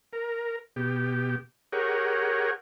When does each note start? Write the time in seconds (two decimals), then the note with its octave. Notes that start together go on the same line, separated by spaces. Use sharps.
0.13 A#4
0.76 B2 G4
1.73 G4 G#4 A#4 C#5 F#5